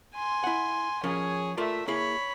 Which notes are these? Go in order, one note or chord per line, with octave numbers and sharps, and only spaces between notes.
G#5 C6
E4 F#5
F3 C#4 G#4 A#4 C#5
A3 F4 A#4 D5 E5
A#3 E4 G#4 C#5 B5